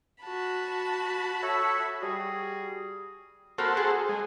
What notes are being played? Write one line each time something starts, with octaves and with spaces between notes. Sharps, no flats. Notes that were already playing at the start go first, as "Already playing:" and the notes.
F#4 A5 B5
A4 C#5 E5
G3 F#4 G#4
A#3 F#4 A4 C5 B5
G#4
G#3